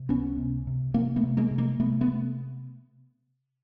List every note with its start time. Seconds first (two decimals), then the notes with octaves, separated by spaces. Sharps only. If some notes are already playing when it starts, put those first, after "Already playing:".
Already playing: C3
0.09 C#2 B3 C#4
0.38 C3
0.67 C3
0.94 C3 A#3 C4
1.16 A3 B3
1.23 C3
1.37 G#3 A#3
1.51 C3
1.58 G#3 A#3
1.79 C3 A3 B3
2.01 A3 B3
2.08 C3